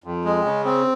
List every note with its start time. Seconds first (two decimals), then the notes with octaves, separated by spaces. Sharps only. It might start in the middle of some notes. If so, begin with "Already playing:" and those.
0.04 F2
0.24 G#3
0.45 C#3
0.65 C4